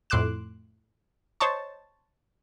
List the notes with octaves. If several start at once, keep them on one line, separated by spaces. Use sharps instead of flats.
F2 A2 C6 D6 F#6 E7
C5 C#5 D#5 A5 C#6